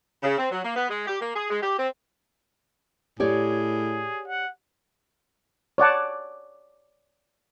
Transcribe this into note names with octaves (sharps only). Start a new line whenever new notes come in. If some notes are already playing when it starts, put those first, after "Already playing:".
C#3
C4
F#3
A#3
B3
G#3
G4
A#3
G#4
G#3
G4
C4
A2 G4 G#4 C#5 D5
F#5
C#5 D5 F#5 A5